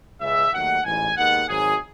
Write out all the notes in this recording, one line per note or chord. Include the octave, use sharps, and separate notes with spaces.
C#2 C#3 G#3 B3 E5
D#2 D#3 F#3 A3 F#5
A1 G#2 E3 G#5
D#2 D#3 G#3 B3 F#5
G#1 G#2 F#3 G#4